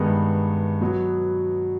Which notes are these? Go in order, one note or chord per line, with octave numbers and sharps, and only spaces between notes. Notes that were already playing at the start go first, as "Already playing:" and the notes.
Already playing: G2 D#3 G#3 B3
B2 F#3 B3